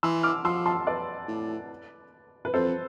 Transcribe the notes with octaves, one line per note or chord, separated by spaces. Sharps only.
E3 C6 E6
D6 F6
F3 C6 E6
A5 C6
B4 D5
A2
B4
F2 A4 C5